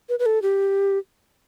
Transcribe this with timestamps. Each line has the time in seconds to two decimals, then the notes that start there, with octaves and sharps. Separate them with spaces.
0.09 B4
0.19 B4
0.26 A4
0.42 G4